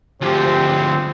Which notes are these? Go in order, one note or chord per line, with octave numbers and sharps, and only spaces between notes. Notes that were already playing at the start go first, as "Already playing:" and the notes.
D2 F3 C4 G4